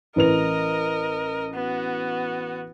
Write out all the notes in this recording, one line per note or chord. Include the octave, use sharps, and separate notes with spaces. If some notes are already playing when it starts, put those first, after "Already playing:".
A1 A#4 B4 D#5 F7
B3 F#4